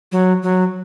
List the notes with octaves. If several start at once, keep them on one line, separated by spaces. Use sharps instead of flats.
F#3
F#3